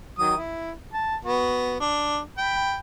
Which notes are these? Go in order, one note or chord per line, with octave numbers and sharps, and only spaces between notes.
D#3 F#3 D#6
E4
A5
B3 F#4
D4
G5 B5